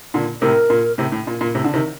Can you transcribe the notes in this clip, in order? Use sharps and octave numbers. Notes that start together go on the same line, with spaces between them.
A#2 D3
A2 C3 A#4
A#2
A2 C3
A2
A#2
A#2
A2 C3
D3
C3 D#3